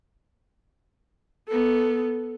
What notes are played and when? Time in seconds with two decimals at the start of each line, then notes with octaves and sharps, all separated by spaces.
1.48 B3 A4